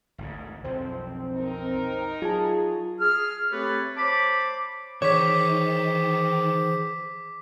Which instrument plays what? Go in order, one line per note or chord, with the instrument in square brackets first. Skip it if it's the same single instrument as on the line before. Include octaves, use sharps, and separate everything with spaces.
[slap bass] G#1 D2 G#2
[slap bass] B1 F2 F3 [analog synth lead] C4
[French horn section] D#4 A#4
[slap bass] F#3 [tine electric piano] F4 A5 [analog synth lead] G#4
[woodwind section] G#4 F6
A3 C4 G4 A4 B4 C#5
C5 C#5 A5 B5 D6
[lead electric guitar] D#3 [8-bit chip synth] E3 G#4 C5 [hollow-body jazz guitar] C#5 [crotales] D6 B6